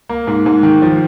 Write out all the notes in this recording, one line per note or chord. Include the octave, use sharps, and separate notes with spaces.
A#3
G#2
G#2
D#3
F3